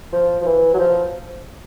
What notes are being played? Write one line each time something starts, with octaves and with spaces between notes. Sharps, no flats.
F3
F3
E3
F#3
F3